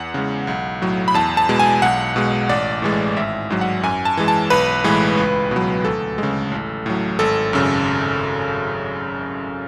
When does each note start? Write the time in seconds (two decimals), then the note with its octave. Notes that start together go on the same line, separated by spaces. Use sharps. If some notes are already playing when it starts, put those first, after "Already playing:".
Already playing: E2 F#5
0.14 C#3 G#3
0.47 B1
0.82 A2 F#3
1.08 B5
1.14 E2 A5
1.37 A5
1.49 B2 G#3
1.59 G#5
1.82 B1 F#5
2.16 B2 G#3
2.49 A1 D5
2.82 A2 E3 G#3
3.17 G#1 E5
3.50 G#2 F#3
3.61 F#5
3.83 F#2 G#5
4.05 A5
4.17 E3 G#3
4.28 A5
4.50 B1 B4
4.84 A2 E3 G#3
5.17 C#2
5.51 B2 F#3
5.84 D2 A4
6.18 C#3 G#3
6.52 A1
6.86 A2 F#3
7.19 G#1 A4
7.53 F#2 C#3